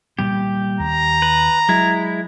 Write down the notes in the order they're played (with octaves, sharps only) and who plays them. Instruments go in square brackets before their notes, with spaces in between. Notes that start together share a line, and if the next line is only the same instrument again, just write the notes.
[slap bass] A#2 G3 B3 [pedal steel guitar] G4
[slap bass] D#2 [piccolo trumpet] A#5
[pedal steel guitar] B4
[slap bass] F#3 [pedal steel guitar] G#3 E4